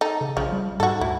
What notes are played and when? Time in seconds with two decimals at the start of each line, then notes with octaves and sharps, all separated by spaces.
0.01 D#4 A4
0.21 C#3
0.37 A#1 C#3 F3
0.52 G3
0.80 G#2 F#4 A4
1.01 D2 E4